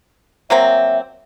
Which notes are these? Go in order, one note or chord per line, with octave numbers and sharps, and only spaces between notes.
F#3 A#3 C4 E5